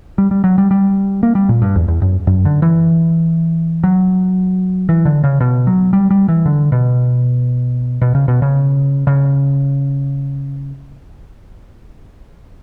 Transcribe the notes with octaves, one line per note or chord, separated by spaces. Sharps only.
G3
G3
F#3
G3
G3
A#3
G3
A#2
G2
E2
E2
F#2
F#2
D3
E3
F#3
E3
D3
C#3
B2
F#3
G3
G3
E3
D3
B2
B2
C#3
B2
C#3
C#3